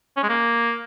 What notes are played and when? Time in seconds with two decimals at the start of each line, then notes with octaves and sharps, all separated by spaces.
0.17 C#4
0.23 G#3
0.29 A#3